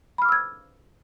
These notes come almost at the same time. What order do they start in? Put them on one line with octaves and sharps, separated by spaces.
B5 F6 D6 E6 G#6